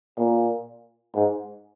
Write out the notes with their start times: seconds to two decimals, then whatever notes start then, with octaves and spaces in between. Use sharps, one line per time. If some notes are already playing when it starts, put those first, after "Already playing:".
0.18 A#2
1.15 G#2